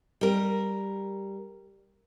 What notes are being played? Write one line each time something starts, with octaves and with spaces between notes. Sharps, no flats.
G3 A#4